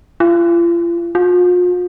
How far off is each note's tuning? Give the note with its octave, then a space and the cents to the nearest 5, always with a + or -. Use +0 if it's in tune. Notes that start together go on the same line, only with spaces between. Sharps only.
F4 -40
F4 +40